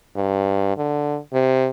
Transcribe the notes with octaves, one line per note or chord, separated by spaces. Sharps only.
G2
D3
C3